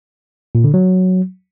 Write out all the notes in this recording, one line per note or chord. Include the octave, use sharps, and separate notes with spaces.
A#2
D3
F#3